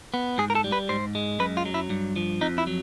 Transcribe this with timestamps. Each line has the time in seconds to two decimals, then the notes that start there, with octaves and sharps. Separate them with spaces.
0.14 B3
0.38 G#2 G#4
0.50 A#4
0.55 A4
0.64 G3
0.72 B4
0.89 G#2 C5
1.15 G#3
1.40 F#2 B4
1.57 F4
1.66 F#3
1.74 E4
1.90 G2
2.16 F3
2.41 F2 D#4
2.58 E4
2.67 F#3